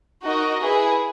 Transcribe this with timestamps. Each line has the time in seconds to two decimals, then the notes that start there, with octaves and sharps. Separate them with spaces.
0.23 D#4 F#4 A#4 D#5
0.60 E4 G#4 B4